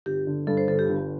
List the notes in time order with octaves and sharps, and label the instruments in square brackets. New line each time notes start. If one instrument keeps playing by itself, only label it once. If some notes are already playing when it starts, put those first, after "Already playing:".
[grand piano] G1 [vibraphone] G4
[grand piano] D3
[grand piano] G2 [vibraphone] A4
[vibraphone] C5
[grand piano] G1 [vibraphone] A4
[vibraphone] G4
[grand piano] G1